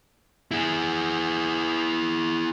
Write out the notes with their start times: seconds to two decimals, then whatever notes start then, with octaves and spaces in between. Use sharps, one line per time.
0.51 E4 G#4